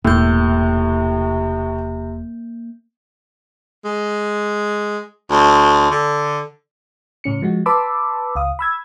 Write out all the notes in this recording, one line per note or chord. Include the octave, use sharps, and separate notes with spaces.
E1 A2 C3 A#3 G6
G#3
D2
D3
A2 C#3 C#4 C#7
F3 G#3 F#4
B4 A5 B5 C6 D6 E6
C#2 F5 D#6
B5 E6 G#6